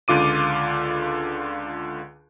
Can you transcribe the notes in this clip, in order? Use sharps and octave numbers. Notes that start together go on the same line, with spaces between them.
C#2 D3 F4 D6 D#7